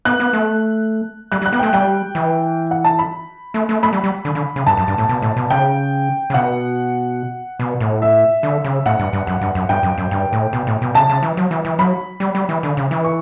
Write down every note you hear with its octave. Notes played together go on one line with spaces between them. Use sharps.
B3 F#6
B3
A3
G3 F#6
G3
F#6
B3
A3 G5
G3 G5
E3
F#5
A5
B5
A3
A3
A3 B5
G3
G3
D3
D3
C#3
G2 A5
F#2
G2
A2
B2
A2
B2
C#3 G5
C#3
B2 F#5
B2
A2
E5
D3
C#3
A2 F#5
G2
G2
F#2
G2
F#2
G2 G5
F#2
F#2
G2
A2
B2
A2
B2
C#3 A5
C#3
E3
F#3
E3
E3
F#3 B5
G3
G3
E3
D3
C#3
E3
C#6